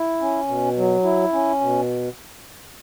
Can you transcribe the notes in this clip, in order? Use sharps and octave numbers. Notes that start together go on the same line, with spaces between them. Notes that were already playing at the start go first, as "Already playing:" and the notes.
Already playing: E4
C#4
B2
F#3
E4
C#4
B2